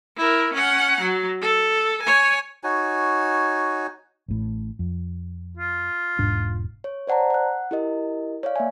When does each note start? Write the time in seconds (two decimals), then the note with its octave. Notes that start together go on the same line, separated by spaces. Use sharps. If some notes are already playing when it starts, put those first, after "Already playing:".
0.17 E4 A#4
0.54 C#4 F#5
1.01 F#3
1.41 A4
2.02 C#5 G#5
2.64 D#4 F#4 C#5 G#5
4.28 A1 A2
4.79 F2
5.57 F4
6.19 E1 G#2 D4
6.84 C#5
7.07 C5 D5 F#5 A5 A#5
7.30 F#5 F#6
7.71 E4 G4 A#4 D#5
8.43 C#5 D5 F5
8.56 A#3 E5 G#5